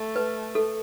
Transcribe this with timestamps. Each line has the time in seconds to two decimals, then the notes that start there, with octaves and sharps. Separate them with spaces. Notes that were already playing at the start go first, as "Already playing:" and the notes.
Already playing: A3
0.16 B4
0.55 A4